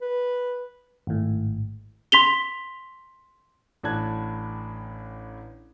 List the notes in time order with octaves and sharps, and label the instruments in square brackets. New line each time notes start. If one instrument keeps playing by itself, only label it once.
[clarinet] B4
[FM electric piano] G#1 A2
[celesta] C6 B6 F7 G7
[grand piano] A1 A2 D4 A5 F#6 G#6